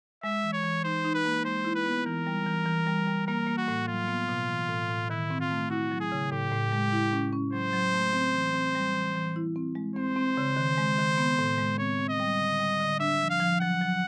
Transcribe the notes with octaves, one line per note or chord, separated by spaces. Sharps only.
G#3 E5
E3
C#5
E3
D#4 C5
D#4
B4
A#3
G#3 C5
E4
B4
B3
E3 A#4
G3
E3
E3
G3
G3
A#3 A#4
A#3
F#4
A2
F#3 F4
B3
B2
E3
A2
A2
D#3 E4
C4
F4
A3
E4 F#4
F#3
G#4
C#3
A2 G4
A2
G#3
E4
C#4
C#4
F#3 C5
F#3
A3
C4
E3
C4
G3
E3
E3
E4
C4
G#3
C4 C5
C4
C#3
D#3
G#3
D#3
B3
A2
G#3
C4 C#5
C4
D#5
G3
D3
G3
D3
D4 E5
F3
F5
F3
F#3 F#5
F#3